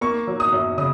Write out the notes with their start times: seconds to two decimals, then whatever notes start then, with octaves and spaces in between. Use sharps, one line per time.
0.01 A#3 C#6
0.27 F#3
0.40 D#6
0.53 F#2
0.77 C#3 D#6